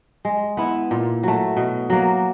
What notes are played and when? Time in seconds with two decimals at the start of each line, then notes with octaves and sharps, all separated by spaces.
0.25 G#3
0.57 B3 E4
0.91 A#2
1.23 F#3 A3
1.57 B2
1.90 F#3 A#3